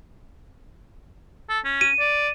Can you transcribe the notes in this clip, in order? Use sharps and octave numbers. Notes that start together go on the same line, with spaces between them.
A4
C#4
D#7
D5